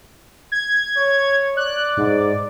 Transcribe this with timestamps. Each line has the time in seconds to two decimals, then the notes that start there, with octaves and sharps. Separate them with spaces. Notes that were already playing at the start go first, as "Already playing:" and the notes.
0.52 G#6
0.98 C#5
1.57 D5 F#6
1.97 G#2